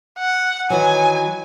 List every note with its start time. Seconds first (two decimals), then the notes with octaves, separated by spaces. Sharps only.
0.19 F#5
0.70 D#3 E3 F#3 G#5